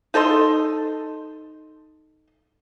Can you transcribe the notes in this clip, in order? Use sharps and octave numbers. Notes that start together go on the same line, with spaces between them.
D#4 A4 D#5 C6